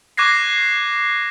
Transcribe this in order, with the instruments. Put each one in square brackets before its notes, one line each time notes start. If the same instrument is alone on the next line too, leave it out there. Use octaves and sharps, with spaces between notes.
[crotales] C#6 D6 F#6 G#6 A#6 C7